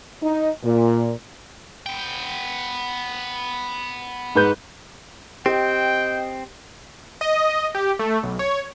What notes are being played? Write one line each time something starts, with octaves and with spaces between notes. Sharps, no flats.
D#4
A#2
B3 G5
G#2 B4 G6
C4 G4 D#5 G5
D#5
G4
A3
B1
C#5